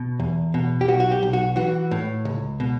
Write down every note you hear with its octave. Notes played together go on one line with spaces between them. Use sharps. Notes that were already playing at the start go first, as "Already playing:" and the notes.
Already playing: B2
E2
B2
G4
B1 F#4
F#4
G4
B1
F#4
E3 F#4
A2
C#2
B2